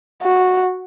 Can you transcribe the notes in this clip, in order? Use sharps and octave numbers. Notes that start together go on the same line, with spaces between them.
F#4